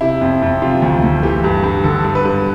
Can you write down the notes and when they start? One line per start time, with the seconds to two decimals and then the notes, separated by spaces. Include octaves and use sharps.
0.01 C3 E4
0.21 F2
0.43 F2
0.62 C3 F4
0.82 D2
1.03 D2
1.23 E3 G4
1.44 G2
1.64 G2
1.84 D3 A4
2.04 G2
2.15 B4
2.25 G2